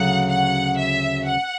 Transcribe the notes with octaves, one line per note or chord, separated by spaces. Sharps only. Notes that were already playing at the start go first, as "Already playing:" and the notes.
Already playing: D2 C#3 F#3 F#5
F#5
E5
F#5